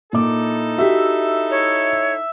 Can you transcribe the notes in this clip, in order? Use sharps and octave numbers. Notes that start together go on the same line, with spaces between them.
A#2 D#4 E4 A4 D6
F#4 G4 E5
C#5